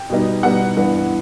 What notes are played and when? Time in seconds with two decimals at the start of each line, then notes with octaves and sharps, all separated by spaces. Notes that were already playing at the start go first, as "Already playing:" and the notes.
Already playing: G5
0.10 B2 G3 B3 D#4
0.43 B2 G3 B3 D#4 F#5
0.76 G2 E3 B3